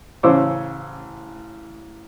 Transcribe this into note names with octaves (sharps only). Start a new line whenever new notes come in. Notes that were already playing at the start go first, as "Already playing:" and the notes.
A1 C#3 C5 C#5 D6 E6